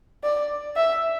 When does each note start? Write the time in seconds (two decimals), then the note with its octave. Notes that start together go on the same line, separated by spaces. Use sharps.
0.23 D5
0.76 E5